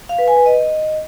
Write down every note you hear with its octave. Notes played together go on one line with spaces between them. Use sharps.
F5
B4
G#5
B4
D#5